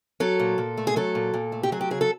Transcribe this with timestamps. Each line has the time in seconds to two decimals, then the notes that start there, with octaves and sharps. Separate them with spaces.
0.20 F#3 A4
0.40 A#2
0.58 A#2
0.77 A3
0.87 G#4
0.96 F#3 A4
1.15 A#2
1.34 A#2
1.52 A3
1.63 G4
1.72 F#3 G#4
1.81 G4
1.91 C#3 G#4
2.01 A4